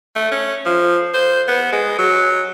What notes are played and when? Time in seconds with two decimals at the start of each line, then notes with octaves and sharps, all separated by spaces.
0.15 A3
0.31 C#4
0.66 F3
1.14 C5
1.48 B3
1.72 G#3
1.98 F#3